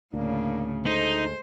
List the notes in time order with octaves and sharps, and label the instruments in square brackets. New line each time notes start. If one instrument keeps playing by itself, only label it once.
[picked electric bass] D2 [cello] A2 C#3 [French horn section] A#3 D4
[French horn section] G#3 A3 A4 [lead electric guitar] D#4 [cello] C5